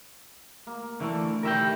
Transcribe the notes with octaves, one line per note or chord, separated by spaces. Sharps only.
A#3
D3 E3 A3 C#6
D#3 G3 A#4 E5 G5